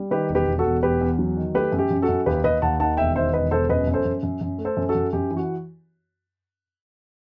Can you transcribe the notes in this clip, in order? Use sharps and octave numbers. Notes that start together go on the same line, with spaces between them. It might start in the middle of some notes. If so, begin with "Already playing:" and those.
Already playing: G3
D#3 G4 B4
E1
G4 B4
E1
F#4 A4
E1
E2 G4 B4
E2
F#3
D#3
A3 G4 B4
F#2
G4
F#2
F#4 A4
F#2
D#2 G4 B4
D#2 B4 D#5
D#2 F#5 A5
D#3 F#5 A5
E1 E5 G5
D#3 C5 E5
E1 B4 D#5
E1 A4 C5
F#2 B4 D#5
F#2
A4 C5
F#2
F#2
F#2
A3
A4 C5
F#2
F#4 A4
F#2
F#2 G4
E3
F#4